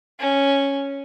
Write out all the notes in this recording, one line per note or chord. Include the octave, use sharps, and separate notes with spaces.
C#4